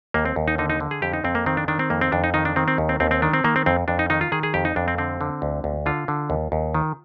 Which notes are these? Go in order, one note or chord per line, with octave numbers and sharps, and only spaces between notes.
D#2 A#3
C4
D#2
D#4
D3 D#4
D#4
D3
G#4
F2 G4
D#4
F2 C4
A#3
D#3 C4
D4
D#3 D4
C4
F2 A#3
C4
F2 D4
D#4
D#3 D#4
D4
D#3 C4
C4
D#2
C4
D#2 C4
C4
D#3 D4
C4
D#3 A#3
C4
F2 C4
F2 D4
D#4
D#3 D#4
F4
D#3 G#4
G#4
F2 G4
D#4
F2 D4
C4
D3 C4
D3
D2
D2
D3 F4
D3
D#2
D#2
D#3